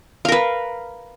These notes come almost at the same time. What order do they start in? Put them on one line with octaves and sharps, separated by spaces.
F5 A#4 B4